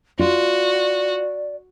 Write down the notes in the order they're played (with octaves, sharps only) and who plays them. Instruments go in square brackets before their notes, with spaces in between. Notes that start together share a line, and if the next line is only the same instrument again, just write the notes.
[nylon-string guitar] F4 [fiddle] F#4 [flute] D5